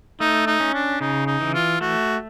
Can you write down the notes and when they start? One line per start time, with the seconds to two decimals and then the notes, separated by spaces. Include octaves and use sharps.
0.20 A3 D#4
0.47 D#4
0.60 C#4
0.74 D4
1.00 C#3 D#4
1.27 D#4
1.41 E3
1.54 F4
1.81 A3 F#4